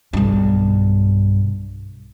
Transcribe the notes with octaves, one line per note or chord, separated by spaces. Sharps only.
B1 G2